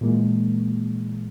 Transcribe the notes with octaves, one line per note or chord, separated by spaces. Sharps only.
A#2 E3 G#3 A#3